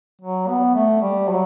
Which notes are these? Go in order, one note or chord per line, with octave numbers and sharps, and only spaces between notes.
F#3
B3
A3
G3
F#3